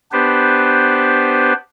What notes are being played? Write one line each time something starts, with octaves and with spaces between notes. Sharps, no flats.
B3 D4 G4 B4 C5